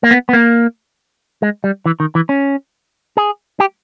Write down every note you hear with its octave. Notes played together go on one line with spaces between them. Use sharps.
A#3
B3
B3
A#3
G#3
G3
E3
D#3
E3
C#4
G#4
G4